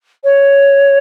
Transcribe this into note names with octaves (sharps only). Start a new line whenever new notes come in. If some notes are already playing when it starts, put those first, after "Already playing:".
C#5